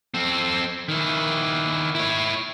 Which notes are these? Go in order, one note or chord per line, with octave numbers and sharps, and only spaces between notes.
C4 A4
D#3 E4
E4 C#5